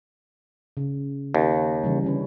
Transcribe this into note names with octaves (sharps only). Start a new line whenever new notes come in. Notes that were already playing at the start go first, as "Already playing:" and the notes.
C#3
D#2
C#3 E3 G3
D3 C#4 B4